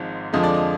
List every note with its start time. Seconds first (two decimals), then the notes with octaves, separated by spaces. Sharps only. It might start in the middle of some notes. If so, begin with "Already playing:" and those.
Already playing: G#1 G#2 F3
0.33 F2 D3 F3 G#3 D#5
0.43 D5
0.54 D#5